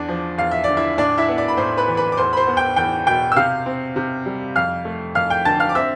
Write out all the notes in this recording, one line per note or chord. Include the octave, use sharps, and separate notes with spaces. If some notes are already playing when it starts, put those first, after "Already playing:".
Already playing: E2 D4 D5
F3
E2 F5
E5
D3 D5
E4 E5
A2 D4 D5
E4 E5
B3
D5 D6
B5
A2 C5 C6
B4 B5
E3
B4 B5
D6
E2 C5 C6
B5
C5 C6
B3
G5 G6
E2 G5 G6
B2 G5 G6
E6
C3 F5 F6
C4
C3
G3
F2 F5 F6
A3
F2 F5 F6
G5 G6
D3 A5 A6
F5 F6
D6
C4 E5 E6